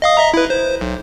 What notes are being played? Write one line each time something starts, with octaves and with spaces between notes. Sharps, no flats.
D#5 F5 D#6
D#5 E5 A#5
E4 B4
C5
B1